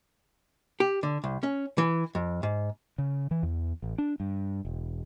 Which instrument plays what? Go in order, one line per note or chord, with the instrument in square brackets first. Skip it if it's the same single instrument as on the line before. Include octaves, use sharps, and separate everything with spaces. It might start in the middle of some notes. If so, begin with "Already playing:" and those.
[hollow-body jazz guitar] G4
D3
C2
C#4
E3
F2
G#2
[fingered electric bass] C#3
E3
E2
A1
D4
G2
E1